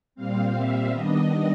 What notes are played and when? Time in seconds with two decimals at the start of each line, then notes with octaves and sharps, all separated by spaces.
0.15 A#2 G3 C4 F5
0.53 E5
0.91 D#3 G3 B3 D4 D#5